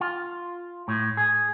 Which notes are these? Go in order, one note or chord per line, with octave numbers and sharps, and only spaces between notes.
F4
A2
G#4